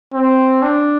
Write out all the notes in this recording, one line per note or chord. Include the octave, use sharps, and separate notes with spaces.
C4
D4